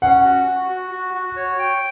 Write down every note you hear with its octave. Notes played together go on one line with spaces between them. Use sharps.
C#4 F#5
F#4
F#4
F#4
F#4
F#4
C#5
G5